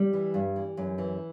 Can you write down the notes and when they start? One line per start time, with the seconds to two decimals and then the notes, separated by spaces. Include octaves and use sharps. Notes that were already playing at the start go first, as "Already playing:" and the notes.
Already playing: G3
0.13 E3
0.34 G2
0.56 E3
0.77 F#2
0.98 E3